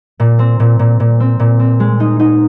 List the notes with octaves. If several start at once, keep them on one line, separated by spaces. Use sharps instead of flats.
A#2
C4
A#2
A#2
A#2
C4
A#2
C4
G#3
D#4
D#4